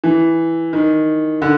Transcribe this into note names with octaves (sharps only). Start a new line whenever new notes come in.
E3
D#3
D3